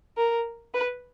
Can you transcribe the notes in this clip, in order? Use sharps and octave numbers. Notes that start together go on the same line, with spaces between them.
A#4
B4